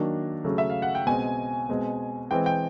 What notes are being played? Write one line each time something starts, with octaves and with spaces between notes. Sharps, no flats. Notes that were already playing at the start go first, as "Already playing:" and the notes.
Already playing: D#3 F#3 A#3 D4
C#3 F#3 A3
E5
F5
F#5
G5
B2 G#3 C4 G#5
B2 G#3 C4
E3 G#3 C4 G5
G5